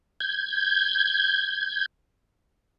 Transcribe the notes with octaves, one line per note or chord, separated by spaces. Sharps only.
G6 G#6